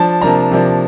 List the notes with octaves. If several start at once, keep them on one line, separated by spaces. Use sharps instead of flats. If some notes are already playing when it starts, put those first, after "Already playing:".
Already playing: F3 D4 A5
C3 F3 A#3 D4 A#5
C3 F3 A#3 D4